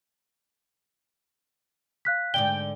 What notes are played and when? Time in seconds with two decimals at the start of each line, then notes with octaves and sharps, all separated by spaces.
2.05 F5 F#6 B6
2.34 G#2 D3 D5 G5 G7